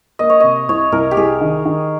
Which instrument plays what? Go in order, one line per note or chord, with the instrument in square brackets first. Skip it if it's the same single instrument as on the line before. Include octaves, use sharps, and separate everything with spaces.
[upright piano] A#3 [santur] D#5
[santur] C#5
[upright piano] C3 [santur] D#5
[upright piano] C2 [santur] C#5
[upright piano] C2 [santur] A#4
[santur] G4
[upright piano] C2 [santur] G#4
[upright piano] D#3
D#3